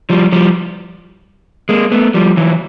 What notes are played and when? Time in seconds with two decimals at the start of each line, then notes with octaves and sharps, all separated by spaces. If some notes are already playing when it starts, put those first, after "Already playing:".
0.10 F3 G3
0.32 F3 G3
1.69 G#3 A#3
1.92 A3 B3
2.14 F3 G3
2.37 E3 F#3